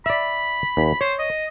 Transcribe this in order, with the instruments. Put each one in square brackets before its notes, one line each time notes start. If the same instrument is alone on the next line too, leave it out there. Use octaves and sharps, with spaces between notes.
[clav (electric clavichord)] D5 E5 [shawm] B5
[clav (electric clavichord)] D#2
[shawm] C5 [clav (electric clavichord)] C#5
[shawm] D#5